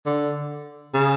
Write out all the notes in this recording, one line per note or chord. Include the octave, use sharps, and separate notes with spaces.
D3
C#3